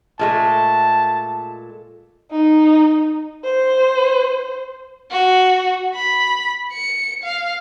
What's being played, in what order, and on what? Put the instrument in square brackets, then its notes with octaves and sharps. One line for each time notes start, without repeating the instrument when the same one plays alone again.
[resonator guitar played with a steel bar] A#2 G#3 A3 [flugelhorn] A5
[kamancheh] D#4
C5
[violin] F#4
B5
C#7
F5